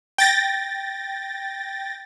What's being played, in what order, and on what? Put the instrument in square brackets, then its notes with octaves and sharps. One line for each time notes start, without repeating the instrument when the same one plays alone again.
[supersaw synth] G5 A6 A#6